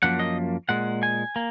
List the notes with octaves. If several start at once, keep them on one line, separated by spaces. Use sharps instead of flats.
F#2 F3 A#3 F#5
D#5
A#2 G#3 F#5
G#5
A#3